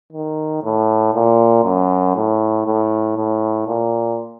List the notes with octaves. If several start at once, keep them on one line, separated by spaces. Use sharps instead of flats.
D#3
A2
A#2
F#2
A2
A2
A2
A#2